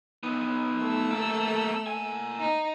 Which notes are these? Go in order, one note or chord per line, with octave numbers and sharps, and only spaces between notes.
B3 D#4
A3 E6
A#3 A4
A#3 G#5
D#4